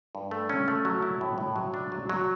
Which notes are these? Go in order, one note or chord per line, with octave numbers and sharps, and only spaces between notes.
G2
A3
C#4
A3
F#3
E4
A2
A2
F#3
D4
F#3
F#3